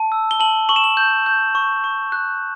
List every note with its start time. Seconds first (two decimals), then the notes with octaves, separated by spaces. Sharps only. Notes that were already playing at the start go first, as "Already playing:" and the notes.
Already playing: A5
0.12 E6
0.31 G7
0.40 A5 F#7
0.69 C#6 F#7
0.76 E7
0.84 F#7
0.97 G6
1.26 G6
1.55 C#6
1.84 C#6
2.12 F#6